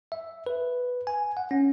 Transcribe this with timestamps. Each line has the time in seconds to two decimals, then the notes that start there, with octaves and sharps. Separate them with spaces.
0.12 E5
0.46 B4
1.07 G#5
1.37 F#5
1.51 C#4